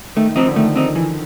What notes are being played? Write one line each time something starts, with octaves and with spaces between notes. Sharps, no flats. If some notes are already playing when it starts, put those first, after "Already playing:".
D#3 A3
F3 C4 D#4
D3
D#3 A3
C4 D#4
E3